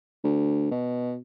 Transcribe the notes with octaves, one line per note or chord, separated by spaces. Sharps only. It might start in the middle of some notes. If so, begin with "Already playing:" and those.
D2
B2